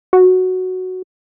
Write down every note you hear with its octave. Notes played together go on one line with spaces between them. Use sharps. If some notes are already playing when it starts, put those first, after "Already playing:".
F#4